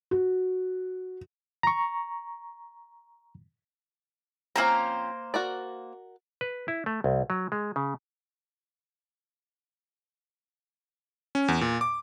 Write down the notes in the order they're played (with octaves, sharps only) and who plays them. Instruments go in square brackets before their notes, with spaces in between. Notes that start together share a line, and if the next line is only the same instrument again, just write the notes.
[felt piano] F#4
[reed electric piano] A#5 C#6
[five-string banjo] F3 C4 C#4 [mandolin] A#3 C5 A#5
[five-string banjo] F#4 A#4 D5
[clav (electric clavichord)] B4
E4
A3
C2
F#3
G#3
C#3
[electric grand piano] C#4
E2
A#2
D6